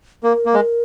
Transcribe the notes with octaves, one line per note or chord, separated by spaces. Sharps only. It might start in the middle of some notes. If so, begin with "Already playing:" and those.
A#3 A#4
A#3
G#3